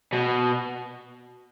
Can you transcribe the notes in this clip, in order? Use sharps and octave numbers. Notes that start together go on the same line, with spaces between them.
B2